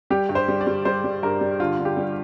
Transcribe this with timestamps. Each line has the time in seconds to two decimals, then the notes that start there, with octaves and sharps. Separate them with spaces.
0.10 G3 G4
0.29 G2
0.35 C5
0.48 G3
0.61 D5
0.67 G3
0.85 G3 C5
1.04 G3
1.23 G2 A#4
1.41 G3
1.60 D3 F4
1.79 D3
1.85 G4
1.97 G3